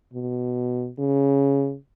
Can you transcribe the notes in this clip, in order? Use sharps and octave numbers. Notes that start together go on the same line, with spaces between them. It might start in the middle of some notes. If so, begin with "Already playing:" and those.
B2
C#3